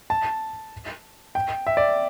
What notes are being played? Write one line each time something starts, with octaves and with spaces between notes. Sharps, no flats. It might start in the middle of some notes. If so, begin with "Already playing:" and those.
A5
G5
E5
D5